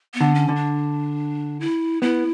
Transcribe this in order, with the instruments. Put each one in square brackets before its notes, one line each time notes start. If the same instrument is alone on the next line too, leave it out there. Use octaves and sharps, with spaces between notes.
[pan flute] B3
[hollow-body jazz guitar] D3
[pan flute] C#4
[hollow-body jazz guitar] D3
[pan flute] D4
E4
[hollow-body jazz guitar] B3 [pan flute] E4